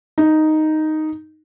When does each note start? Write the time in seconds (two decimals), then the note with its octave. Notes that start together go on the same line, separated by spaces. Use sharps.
0.18 D#4